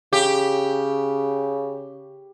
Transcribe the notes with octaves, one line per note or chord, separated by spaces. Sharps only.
C#3 G4